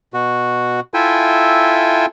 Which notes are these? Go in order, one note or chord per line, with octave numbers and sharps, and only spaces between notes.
B2 F#4
E4 F4 A4 E5 G5 G#5